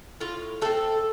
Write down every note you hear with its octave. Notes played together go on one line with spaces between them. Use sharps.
A2 F4
A3 C4 A4